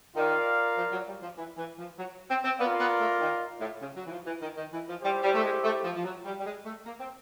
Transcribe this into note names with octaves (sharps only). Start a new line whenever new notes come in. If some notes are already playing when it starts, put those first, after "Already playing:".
D#3 F4 A#4 D5 F5
F3
F#3
G3
F3
E3
E3
F3
F#3
C4
C4
B3 F4 A#4 D5 F5
B3
A3
D#3
A2
C#3
F#3
E3
F3
E3
D#3
D#3
E3
F3
G3 E4 G4 C5
G3
A3
G#3
A3
F3
F3
F#3
G3
G3
G#3
A3
A#3
C4